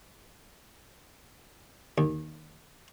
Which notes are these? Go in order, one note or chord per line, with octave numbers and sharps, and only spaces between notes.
D#2